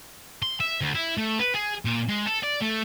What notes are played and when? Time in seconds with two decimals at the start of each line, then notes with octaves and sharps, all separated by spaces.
0.42 C6
0.60 E5
0.81 D2
0.95 E4
1.18 A3
1.39 B4
1.54 G#4
1.85 A#2
2.08 G#3
2.26 A4
2.43 D5
2.62 A3